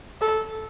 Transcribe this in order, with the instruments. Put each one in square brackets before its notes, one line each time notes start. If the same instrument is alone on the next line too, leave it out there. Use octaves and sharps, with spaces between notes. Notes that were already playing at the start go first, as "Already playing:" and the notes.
[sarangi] A4